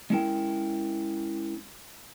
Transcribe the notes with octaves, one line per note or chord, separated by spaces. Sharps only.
G#3 C#4 E4 A#4 G5